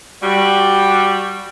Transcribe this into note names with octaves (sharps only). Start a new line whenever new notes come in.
G3 F#4